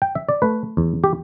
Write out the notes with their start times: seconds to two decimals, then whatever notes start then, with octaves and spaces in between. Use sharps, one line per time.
0.02 G5
0.15 E5
0.29 D5
0.42 A3 B4
0.77 E2
1.04 G4